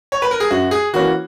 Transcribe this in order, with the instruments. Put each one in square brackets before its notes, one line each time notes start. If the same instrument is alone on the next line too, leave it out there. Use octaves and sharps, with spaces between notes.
[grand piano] C#5
B4
A#4
G#4
[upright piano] F#2 [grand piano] F#4
[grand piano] G#4
[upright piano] E3 A#3 C#4 [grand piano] F#4